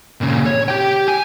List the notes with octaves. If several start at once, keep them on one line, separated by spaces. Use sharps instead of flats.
A#2 C#3
C#5
G4 G5
G#5